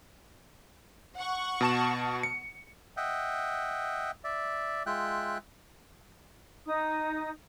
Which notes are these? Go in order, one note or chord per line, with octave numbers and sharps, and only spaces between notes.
F#5 C#6
B2 A5 E7
C#7
D#5 E5 F#5 G5
D5 E5
G#3 F4 E5 G5 F#6
D#4 D#6